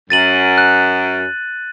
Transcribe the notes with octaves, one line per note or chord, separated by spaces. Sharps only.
F#2 A6 D#7 F#7
F#6